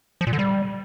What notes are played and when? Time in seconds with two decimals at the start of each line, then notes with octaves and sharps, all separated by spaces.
0.21 F3
0.27 A#2
0.33 D3
0.39 G3